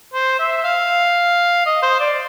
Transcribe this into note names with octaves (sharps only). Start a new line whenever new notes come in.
C5
E5
F5
D#5
C5
D5